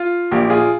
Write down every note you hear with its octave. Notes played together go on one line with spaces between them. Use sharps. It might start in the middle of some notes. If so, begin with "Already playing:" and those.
Already playing: F4
A#1 A#2 F3 G4
F4 G#4